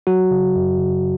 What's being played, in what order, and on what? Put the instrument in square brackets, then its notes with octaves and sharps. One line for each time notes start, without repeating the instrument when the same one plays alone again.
[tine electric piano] F#3 F#4
C#3
F#2
C#3